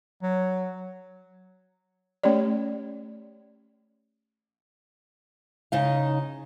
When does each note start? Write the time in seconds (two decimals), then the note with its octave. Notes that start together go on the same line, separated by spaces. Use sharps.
0.22 F#3
2.23 A3 C#4 G4 C#5 D5
5.72 C#3 D#4 F5